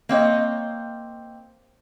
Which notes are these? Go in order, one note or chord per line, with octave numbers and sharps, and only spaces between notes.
A#3 C4 C#5 D#5